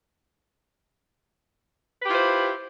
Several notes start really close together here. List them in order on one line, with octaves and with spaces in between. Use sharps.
B4 G4 E4 F4 C5